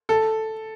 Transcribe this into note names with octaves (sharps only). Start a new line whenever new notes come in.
A4